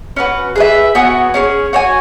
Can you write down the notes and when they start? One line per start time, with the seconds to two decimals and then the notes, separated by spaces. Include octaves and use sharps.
0.16 C#4 F#4 B4
0.56 G#4 B4 E5
0.95 B3 F#4 C#5 G#5
1.34 C#4 G#4 C#5
1.73 F#4 C#5 G#5